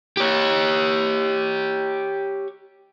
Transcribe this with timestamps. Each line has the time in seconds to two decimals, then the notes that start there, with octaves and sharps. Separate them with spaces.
0.17 G4 C#5